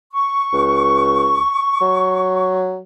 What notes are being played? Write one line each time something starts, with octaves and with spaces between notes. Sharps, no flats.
C#6
C#2
F#3